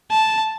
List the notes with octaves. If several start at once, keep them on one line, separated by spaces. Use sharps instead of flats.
A5